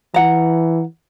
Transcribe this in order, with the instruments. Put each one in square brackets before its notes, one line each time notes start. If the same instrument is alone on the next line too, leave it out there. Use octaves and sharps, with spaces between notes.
[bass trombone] E3 [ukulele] F#5 A#5